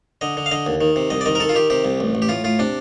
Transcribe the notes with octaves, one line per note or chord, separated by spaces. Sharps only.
D3 D#5
D3
F5
D3 D#5
D#2
D#3
C3
C2 D#5
D5
D#3 D#5
A#4
D#3 A4
F4
D#3 G4
C3 G4
C2
A1
A1
G4
A2 F4
A2 F4
C3 D4